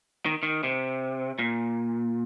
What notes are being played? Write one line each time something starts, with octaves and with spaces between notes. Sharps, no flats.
D#3
D#3
C3
A#2